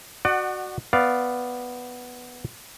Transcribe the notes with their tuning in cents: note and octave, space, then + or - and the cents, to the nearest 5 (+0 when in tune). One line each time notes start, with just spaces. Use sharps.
F#4 +0 D5 +40 F#5 +15
B3 +0 D5 +0 F5 +0